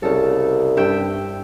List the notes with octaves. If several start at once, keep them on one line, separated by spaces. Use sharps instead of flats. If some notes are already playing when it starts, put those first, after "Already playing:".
C2 C#3 A4
G2 E5 G5